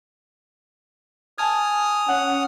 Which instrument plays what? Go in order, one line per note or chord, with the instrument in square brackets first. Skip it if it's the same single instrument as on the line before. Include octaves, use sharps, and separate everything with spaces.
[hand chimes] G#5 A5 G#6 [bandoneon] D#6 F6
[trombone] C#4 [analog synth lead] F#5